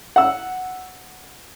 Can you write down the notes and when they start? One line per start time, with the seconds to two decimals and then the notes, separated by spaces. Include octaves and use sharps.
0.16 F#5 E6